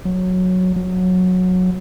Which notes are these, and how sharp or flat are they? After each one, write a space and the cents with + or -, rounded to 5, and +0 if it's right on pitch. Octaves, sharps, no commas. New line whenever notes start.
F#3 -10
F#3 -15